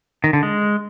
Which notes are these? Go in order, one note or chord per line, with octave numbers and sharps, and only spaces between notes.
D#3
D3
G#3